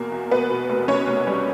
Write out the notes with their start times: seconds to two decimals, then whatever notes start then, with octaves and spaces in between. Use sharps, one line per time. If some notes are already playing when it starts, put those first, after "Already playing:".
Already playing: E2 B2 A#3 A#4
0.12 E2
0.31 B2 B3 B4
0.50 B2
0.70 F1
0.88 F1 C#4 C#5
1.08 F1
1.27 G3